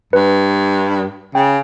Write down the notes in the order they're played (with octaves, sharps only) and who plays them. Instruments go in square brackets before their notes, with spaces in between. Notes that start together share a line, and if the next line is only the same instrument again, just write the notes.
[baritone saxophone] G2 [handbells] B4
[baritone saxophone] C#3 [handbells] G5